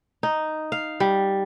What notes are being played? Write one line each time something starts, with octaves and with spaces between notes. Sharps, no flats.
D#4
F5
G3